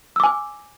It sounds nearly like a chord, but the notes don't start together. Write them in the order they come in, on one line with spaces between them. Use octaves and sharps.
E6 D6 G#5